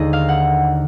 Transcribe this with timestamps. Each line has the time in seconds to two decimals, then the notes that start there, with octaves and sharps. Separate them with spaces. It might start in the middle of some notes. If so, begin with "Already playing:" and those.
Already playing: D#2 D3 G#3 D#5
0.13 F5
0.29 F#5